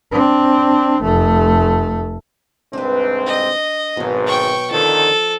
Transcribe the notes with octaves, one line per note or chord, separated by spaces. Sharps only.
C4 D4
F1 A3
C2 G#2 C4 D4 B4
D#5
G#1 G#2 B2 F#3
G5 C#6
F2 D3 D#3 F3 A4